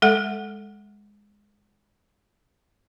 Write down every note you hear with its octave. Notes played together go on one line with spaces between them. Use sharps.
G#3 A4 F#5